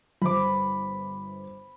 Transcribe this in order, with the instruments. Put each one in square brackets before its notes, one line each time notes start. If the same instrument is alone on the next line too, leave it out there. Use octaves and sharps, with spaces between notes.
[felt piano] G1 C5 [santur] B5 D6